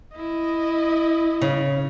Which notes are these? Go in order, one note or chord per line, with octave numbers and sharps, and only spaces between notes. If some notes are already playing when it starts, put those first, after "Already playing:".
E4 D#5
C#3